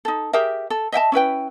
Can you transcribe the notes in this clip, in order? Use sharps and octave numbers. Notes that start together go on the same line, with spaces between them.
D#4 A4
G4 G#4 A#4 E5
A4
D#5 E5 G5 A5
C#4 E4 B4 G5